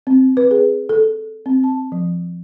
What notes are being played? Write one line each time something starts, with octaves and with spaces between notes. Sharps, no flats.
C4
B4
G#4
A4
C4
A5
F3